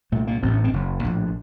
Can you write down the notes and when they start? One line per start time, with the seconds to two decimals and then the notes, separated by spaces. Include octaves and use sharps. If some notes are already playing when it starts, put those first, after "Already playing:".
0.12 C2 A#2 A3
0.27 A#3
0.42 A1 A2 C4
0.53 C#4
0.64 C4
0.73 F#1 F#2 C#3
1.04 A#1 A2